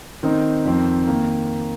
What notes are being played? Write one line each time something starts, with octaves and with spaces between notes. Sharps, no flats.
D#3 C4 D#4
F2 D#3 C4
D#3 A#3